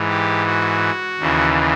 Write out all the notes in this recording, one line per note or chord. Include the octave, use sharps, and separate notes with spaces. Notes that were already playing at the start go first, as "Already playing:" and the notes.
Already playing: G#2 E3
G4
F#4
D#2 C#3 E3